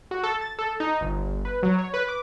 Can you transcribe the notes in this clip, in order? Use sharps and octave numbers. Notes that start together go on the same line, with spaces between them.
F#4
A4
A6
A4
D#4
G1
B4
F#3
C#5
B4
D6